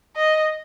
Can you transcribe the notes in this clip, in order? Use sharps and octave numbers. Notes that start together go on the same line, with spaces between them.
D#5